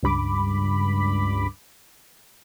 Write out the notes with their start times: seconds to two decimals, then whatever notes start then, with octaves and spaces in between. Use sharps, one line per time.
0.03 C#2 G2 B5 D6